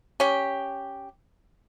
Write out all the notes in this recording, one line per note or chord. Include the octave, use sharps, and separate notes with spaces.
C#4 G4